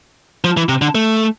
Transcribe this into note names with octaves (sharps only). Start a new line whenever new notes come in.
F3
E3
C3
D3
A3